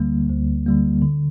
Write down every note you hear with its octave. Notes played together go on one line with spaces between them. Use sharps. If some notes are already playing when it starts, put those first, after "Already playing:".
Already playing: D2 D3 G3 A#3
D2
D3 G3 A#3
D3